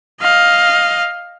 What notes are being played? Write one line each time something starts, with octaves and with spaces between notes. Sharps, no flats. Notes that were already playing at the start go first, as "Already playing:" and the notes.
D#5 F5